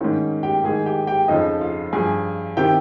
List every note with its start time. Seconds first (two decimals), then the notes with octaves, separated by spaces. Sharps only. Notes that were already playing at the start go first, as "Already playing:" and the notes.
0.01 G#2 D#3 C#4
0.43 G4 G5
0.64 G#2 D#3 G#4 G#5
0.86 G4 G5
1.07 G4 G5
1.28 F2 C#3 F3 D#4 D#5
1.61 F4 F5
1.93 G2 F3 G#4 G#5
2.57 C3 D#3 G4 G5